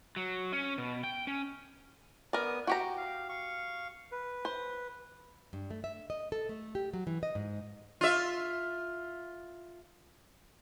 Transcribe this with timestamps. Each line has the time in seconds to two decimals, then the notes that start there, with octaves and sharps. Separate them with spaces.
0.16 F#3
0.52 C#4
0.78 B2
1.04 G5
1.27 C#4
2.33 B3 A#4 D5 D#6
2.67 F#4 G4 G5 A#5
2.98 F5
3.29 F5 C#6
4.12 B4
4.45 C5
5.53 G2
5.71 A3
5.84 E5
6.10 D#5
6.32 A4
6.49 A3
6.75 G4
6.93 F#3
7.07 E3
7.23 D#5
7.35 G#2
8.01 F4 E5